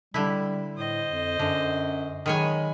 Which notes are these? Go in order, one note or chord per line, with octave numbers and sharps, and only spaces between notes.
D3 G3 E4
A2 C5 D#5
F2
F#2 D3
D#3 F#3 G#3 C#5 G#5 B5